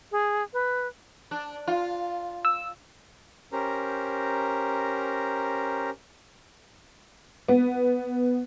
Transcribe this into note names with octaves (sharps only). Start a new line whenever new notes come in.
G#4
B4
D4
F4
E6
C#4 G4 A#4 C5 A#5
B3